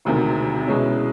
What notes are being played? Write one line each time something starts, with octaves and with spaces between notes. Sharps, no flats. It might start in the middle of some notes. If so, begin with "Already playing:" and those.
E1 D2 C3 D#3
C2 B2 G#3 C#4 E4